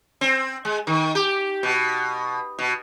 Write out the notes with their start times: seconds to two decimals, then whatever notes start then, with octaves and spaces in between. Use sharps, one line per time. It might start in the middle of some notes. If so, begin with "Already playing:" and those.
0.21 C4
0.65 G#3
0.87 D#3
1.15 G4
1.63 B2
2.59 B2